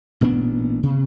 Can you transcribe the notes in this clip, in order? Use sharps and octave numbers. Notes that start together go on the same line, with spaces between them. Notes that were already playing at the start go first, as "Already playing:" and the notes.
A1 A#2 B3 D4
C3